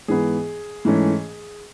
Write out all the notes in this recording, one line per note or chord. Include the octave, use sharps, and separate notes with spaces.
G#2 E3 B3 G#4
G#2 E3 A3 C#4